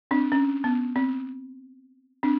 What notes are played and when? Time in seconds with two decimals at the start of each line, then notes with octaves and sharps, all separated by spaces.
0.11 C4 D4
0.32 C#4
0.64 B3
0.96 C4
2.23 C4 D4